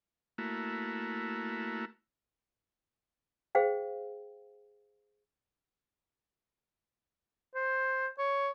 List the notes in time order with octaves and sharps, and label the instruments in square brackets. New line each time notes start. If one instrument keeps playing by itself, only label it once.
[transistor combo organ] A3 A#3 E4 F#4
[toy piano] G#4 C5 F5 G5
[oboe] C5
C#5